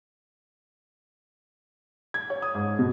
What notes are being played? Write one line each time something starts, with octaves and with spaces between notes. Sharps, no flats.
G#6
C#5
D#6
G#2
B2